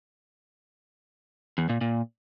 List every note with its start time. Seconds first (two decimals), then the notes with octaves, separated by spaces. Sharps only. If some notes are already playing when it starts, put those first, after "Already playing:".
1.58 E2
1.70 A#2
1.81 A#2